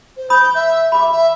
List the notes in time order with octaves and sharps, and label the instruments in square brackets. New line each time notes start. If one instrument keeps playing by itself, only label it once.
[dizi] C5
[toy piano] B5 D#6 [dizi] G6
[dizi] E5
[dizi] E5 [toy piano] B5 D6
[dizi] E5